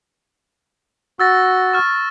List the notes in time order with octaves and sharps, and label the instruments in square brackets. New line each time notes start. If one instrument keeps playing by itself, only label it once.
[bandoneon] F#4 [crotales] E6 A6 A#6
[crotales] C#6 F6